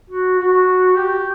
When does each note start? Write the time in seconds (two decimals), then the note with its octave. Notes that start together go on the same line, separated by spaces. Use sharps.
0.10 F#4
0.39 F#4
0.96 G4